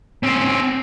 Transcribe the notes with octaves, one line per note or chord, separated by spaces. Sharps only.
C4 C#4